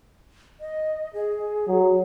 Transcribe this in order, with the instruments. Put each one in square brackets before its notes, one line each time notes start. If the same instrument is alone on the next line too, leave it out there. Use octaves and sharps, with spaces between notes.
[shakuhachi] D#5
G#4
[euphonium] F#3